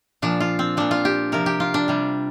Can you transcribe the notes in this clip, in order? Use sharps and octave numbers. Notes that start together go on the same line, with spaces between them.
A#2 F3 D4
F4
C4
A#2 F3 D4
F4
G4
C3 F3 A#4
G4
F4
D4
C3 G3